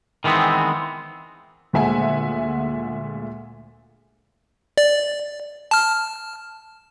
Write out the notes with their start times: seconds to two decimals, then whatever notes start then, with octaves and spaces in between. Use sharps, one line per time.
0.24 D#3 E3 G#3 B3 C4
1.73 D2 A#2 G#3 E5 F#5 G#5
4.78 D5
5.71 A5 F6